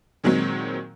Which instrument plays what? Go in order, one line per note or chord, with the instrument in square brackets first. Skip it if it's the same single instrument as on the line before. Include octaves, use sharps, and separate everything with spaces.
[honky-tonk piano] A#2 D#3 F#3 G#3 C4